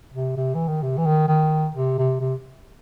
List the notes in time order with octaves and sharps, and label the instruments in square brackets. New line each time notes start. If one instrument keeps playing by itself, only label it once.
[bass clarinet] C3
C3
E3
D#3
C3
E3
D#3
D#3
C3
C3
C3